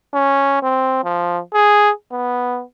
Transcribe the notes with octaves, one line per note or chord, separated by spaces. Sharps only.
C#4
C4
F3
G#4
B3